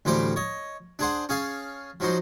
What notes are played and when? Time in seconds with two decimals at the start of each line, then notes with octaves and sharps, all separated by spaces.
0.05 D2 A2 E3 G3 C5 D6
0.36 C#5 D#5
0.99 D4 G#4 C5 F#5
1.29 C#4 G#4 F5 A5
2.00 F3 F#3 D#4 F#4 C5